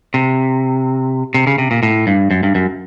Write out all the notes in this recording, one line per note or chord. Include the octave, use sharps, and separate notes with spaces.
C3
C3
C#3
C3
A#2
A2
G2
F#2
G2
F#2